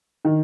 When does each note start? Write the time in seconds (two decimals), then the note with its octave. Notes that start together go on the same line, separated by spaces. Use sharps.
0.25 D#3